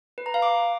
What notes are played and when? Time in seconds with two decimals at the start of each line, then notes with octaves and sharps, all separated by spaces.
0.18 B4
0.26 A#5
0.34 F5
0.42 D6